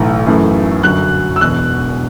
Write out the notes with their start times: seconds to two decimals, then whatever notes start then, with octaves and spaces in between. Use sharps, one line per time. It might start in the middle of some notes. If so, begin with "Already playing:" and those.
Already playing: B1 A2 E3
0.27 F#2 E3 A3
0.83 G1 F#2 F#3 F#6
1.36 E6
1.41 E1 E2 B2 F#6